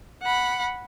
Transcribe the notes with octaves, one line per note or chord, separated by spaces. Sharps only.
F#5 B5